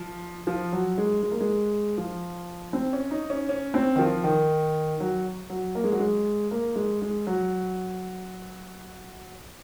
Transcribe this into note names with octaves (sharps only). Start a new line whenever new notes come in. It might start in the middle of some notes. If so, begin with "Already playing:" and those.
Already playing: F3
F3
F#3
G#3
G#3
A#3
G#3
F3
C4
C#4
D#4
C#4
C#4
C4
D#3
F3
D#3
F#3
F#3
A#3
G#3
F#3
G#3
A#3
G#3
G#3
F#3